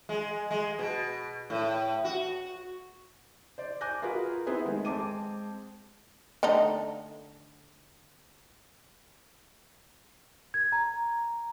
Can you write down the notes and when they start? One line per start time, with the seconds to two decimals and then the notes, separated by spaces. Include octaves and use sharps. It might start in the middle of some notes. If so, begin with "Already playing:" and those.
0.09 G#3
0.51 G#3
0.79 B2
1.50 A2
2.04 F#4
3.58 C5 D5
3.81 G#5 D6 F#6 G6 A#6
4.02 F4 F#4 G#4 A#4 B4
4.46 B3 C4 E4 G#4 B4
4.66 D#3 G#3 A3
4.85 G#3 C4 A5 D6 D#7
6.43 D3 A3 D#4
10.54 G#6
10.72 A#5